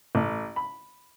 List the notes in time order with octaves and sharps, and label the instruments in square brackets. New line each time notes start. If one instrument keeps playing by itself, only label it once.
[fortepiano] A1
B5